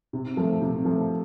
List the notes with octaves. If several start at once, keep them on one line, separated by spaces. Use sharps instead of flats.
C3
F3 A3
C3
F3 A3